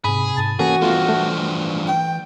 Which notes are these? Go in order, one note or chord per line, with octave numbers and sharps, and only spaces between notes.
G#2 C3 G#4 B5
G#2 A5
E3 A#3 C#4 F#4 G#4 A4
G2 F3 A3 B3 F4
A3
G5